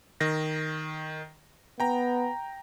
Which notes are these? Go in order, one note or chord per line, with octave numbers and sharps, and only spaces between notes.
D#3 A#6
B3 G5 A#5